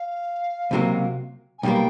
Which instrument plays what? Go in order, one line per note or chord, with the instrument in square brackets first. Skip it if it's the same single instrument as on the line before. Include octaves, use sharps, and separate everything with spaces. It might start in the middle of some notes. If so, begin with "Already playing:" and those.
Already playing: [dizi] F5
[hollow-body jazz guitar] C#2 C3 D#3 F#3 A#3
[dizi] G#5
[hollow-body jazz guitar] B1 B2 G3 A#3 [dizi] G5